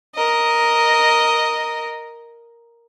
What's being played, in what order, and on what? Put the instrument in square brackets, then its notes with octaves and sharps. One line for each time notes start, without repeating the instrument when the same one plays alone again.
[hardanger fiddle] A#4 D#5